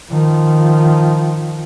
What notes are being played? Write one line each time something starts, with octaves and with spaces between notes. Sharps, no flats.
D#3 F3